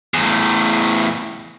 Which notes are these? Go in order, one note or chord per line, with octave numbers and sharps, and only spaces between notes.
E2 A2